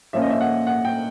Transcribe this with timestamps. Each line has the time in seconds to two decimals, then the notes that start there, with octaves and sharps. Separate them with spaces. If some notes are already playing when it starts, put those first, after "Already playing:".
0.13 A#2 F3 A#3 C#4 E5
0.22 D#5
0.30 E5
0.41 F#5
0.67 F#5
0.85 G5